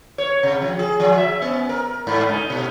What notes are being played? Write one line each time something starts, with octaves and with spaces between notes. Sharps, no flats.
C#5
C3
F3
G#4
F3
E5
B3
A#4
G#2
D#4
B2